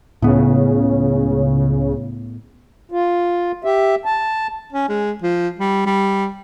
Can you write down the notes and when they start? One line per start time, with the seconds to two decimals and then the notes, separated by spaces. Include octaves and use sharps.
0.22 C#2 A2 C#3 B3
2.92 F4
3.64 G4 E5
4.05 A5
4.73 C#4
4.89 G#3
5.22 F3
5.59 G3
5.86 G3